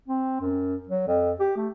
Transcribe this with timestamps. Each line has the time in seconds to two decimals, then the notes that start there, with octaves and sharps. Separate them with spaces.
0.08 C4
0.41 F#2
0.89 F#3
1.08 F2
1.40 G4
1.57 A3